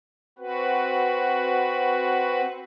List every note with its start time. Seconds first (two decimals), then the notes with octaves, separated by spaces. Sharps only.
0.38 C4 F#4 B4